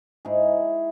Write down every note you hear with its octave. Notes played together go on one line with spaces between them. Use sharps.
G#2 E4 G#4